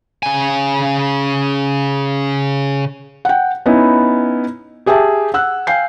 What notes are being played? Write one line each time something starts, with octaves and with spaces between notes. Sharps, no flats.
C#3 G#5
F#5 G5
B3 C#4 D#4 E4
G4 G#4 E5 G5 A5
F#5 E6 F#6
F5 G5 G#5 G6 C7